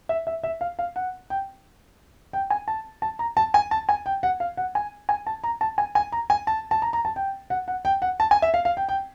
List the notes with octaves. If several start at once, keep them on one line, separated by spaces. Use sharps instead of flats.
E5
E5
E5
F5
F5
F#5
G5
G5
G#5
A5
A5
A#5
A5
G#5
A5
G#5
G5
F#5
F5
F#5
G#5
G#5
A5
A#5
A5
G#5
G#5
A#5
G#5
A5
A5
A#5
A#5
A5
G5
F#5
F#5
G5
F#5
A5
G#5
E5
F5
F5
G5
G5